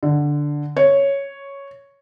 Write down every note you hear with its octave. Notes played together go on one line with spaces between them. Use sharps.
D3
C#5